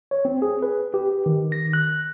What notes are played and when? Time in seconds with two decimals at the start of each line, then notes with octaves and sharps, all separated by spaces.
0.11 C#5
0.25 C4
0.42 G#4
0.62 B4
0.94 G4
1.26 D#3
1.52 A#6
1.73 F#6